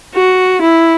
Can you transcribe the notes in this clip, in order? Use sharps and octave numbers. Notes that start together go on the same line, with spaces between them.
F#4
E4